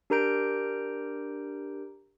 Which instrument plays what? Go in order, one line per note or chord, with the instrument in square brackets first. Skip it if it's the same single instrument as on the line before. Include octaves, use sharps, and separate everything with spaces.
[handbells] D4 G4 A#4 A#5 G6 D7